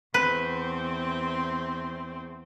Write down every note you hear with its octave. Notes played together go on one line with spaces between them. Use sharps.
E2 C4 B4